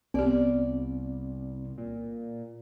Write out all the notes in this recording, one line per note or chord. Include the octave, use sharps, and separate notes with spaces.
C2 B3 C4 G4 D5
A#2